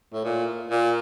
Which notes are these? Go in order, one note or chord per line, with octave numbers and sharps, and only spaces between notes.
A2
A#2
A#2